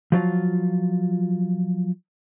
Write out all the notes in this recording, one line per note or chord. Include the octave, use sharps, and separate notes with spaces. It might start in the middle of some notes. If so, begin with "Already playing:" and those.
F3 F#3 F4